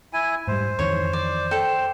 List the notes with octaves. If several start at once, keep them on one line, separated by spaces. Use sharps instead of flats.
E4 G#5
G#2 G3 C5
F2 D#3 E3 C#5
D5
A4 G5